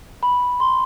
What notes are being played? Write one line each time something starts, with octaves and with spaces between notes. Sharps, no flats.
B5
C6